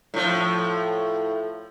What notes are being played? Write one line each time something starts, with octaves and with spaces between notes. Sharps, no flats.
A2 F3